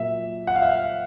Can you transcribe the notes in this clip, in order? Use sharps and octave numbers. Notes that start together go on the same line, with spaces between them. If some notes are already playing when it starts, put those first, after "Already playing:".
Already playing: A#2 F#3 A#3 E5
F#5
F5
E5
F5